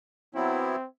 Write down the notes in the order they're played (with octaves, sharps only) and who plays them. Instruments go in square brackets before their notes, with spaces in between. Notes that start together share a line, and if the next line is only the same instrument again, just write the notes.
[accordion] F#3 B3 E4 [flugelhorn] C4